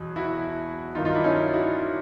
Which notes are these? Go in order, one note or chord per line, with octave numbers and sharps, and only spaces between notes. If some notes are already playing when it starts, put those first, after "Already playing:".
Already playing: E2 B2 F#3
E4 F#4
G2 D#3 F#3 D#4 F4
D#4 F4
D4 E4
C#4 D#4
E4 F#4